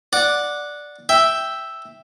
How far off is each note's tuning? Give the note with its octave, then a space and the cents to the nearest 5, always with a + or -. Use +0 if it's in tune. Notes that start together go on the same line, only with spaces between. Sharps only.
D5 +0 F#5 -10
E5 +0 G5 +0